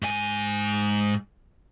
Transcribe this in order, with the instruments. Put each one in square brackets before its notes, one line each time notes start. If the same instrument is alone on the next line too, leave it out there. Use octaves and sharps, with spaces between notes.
[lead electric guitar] G#2 G#5